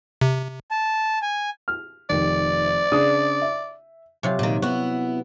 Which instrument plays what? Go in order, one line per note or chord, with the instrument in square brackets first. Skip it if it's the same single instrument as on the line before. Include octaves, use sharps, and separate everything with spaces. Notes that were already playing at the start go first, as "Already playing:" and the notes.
[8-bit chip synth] C3
[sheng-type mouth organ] A5
G#5
[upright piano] F6
[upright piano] F1 D#3 [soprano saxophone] D5
[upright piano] C#3 D4 D#6
E5
[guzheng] C3 F#3 F4
[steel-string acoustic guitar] A#2 D#3
[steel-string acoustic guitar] B3 E4 [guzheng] F#4